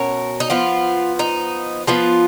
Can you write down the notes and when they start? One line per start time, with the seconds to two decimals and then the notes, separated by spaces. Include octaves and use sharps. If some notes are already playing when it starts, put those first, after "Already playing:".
Already playing: B2 C#4 A#4 C#5
0.40 D#4
0.50 F3 B3 F4
1.19 D#4
1.87 F3 B3 F4